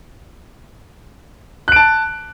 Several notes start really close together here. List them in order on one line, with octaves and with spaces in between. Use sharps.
F#6 D7 A5